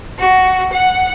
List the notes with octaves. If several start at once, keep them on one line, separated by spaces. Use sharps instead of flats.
F#4
F#5